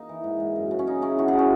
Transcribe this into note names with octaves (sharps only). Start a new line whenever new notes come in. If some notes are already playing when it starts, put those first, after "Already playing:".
Already playing: A#3 D#4
E3
G#2
G#2
F#2
C#3
C#4
C#3 D#4
C#3 C#4 E4
B2 D#4 F#4
E4 G#4
B2
C#4 E4